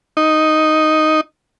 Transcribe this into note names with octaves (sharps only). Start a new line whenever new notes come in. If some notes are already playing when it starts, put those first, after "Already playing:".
D#4